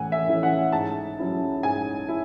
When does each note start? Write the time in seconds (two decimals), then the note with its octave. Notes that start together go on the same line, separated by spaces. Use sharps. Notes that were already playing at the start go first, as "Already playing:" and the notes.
Already playing: A2 E3 A3 C#4 F#5 G#5
0.12 E5
0.27 E3 A3 C#4 E4
0.43 F#5
0.72 G#2 A5
1.19 F#3 C#4 E4
1.63 G#2 G#5
2.09 E4